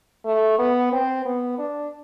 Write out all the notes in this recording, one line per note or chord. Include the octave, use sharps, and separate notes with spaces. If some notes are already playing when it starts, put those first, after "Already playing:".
A3
B3
C4
B3
D4